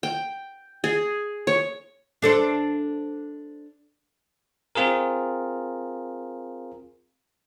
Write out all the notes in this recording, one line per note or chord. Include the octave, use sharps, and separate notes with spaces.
G5
G#4
C#5
D4 A4 C5
C4 F4 G#4 A#4